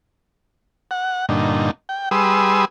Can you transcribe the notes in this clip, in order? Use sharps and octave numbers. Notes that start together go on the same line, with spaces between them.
F#5
G2 A#2 D3 D#4
G5
G3 G#4 B4 C6 D#6 E6